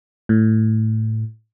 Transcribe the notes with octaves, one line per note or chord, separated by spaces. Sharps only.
A2